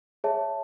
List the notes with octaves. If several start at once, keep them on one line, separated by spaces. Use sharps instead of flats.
G#4 C#5 E5 A5